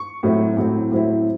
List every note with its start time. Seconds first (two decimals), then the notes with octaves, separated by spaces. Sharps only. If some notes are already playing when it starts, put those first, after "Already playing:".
Already playing: C#6
0.23 A2 F#3 C4 E4
0.57 A2 F#3 C4 E4
0.92 A2 F#3 C4 E4